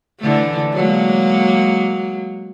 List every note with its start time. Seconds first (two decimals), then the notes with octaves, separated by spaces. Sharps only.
0.19 D3 E3 A3
0.72 F#3 G#3 A#3